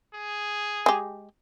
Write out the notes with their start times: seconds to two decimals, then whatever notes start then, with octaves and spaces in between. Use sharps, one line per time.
0.14 G#4
0.86 G#3 G4